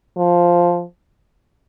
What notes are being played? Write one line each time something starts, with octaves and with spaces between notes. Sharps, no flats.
F3